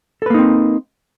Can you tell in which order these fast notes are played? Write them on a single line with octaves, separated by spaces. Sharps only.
A4 B4 A#3 D#4 C4